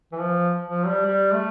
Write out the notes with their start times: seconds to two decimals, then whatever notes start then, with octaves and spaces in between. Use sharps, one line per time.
0.12 E3
0.19 F3
0.67 F3
0.86 G3
1.05 G3
1.33 A3